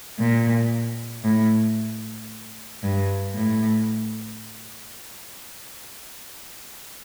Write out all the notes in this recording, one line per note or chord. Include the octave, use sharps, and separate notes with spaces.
A#2
A2
G2
A2